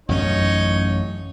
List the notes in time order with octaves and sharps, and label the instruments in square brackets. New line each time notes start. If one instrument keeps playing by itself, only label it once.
[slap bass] A1 F#2 C#4 [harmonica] D#4 C#5